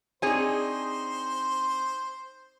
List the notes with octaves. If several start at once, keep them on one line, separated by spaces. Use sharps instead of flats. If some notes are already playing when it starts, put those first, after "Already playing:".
C4 D4 D#4 G#4 C5 C#5 G#5